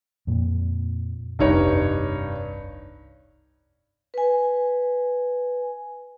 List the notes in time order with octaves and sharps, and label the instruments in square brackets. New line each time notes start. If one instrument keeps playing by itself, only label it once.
[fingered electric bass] F2 A#2
[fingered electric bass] F1 C2 C3 [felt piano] G2 D#4 C#5
[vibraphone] B4 G#5